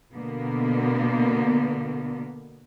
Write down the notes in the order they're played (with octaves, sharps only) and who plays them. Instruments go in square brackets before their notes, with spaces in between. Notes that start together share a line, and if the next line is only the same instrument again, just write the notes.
[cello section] B2 D3 A#3 B3